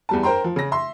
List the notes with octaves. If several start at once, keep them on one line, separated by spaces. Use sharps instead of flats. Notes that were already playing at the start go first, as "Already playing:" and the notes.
E2 G3 A5
A#4 C5 G5 A#5 C6
F3
C#3 A#6
E5 C6